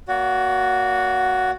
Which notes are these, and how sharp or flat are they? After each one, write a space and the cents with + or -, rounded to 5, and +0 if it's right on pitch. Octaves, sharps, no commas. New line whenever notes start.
A#3 +20 F#4 +0 D5 -40